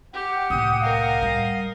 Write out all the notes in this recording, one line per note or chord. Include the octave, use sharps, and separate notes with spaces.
G4 F#5 G5
C2 A2 D#6
A#4 D#5 F5
G3